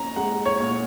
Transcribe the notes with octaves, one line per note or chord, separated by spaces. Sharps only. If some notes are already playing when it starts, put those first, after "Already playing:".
Already playing: A#2 C#4 A#5
G#3 F#5
C#5
A#2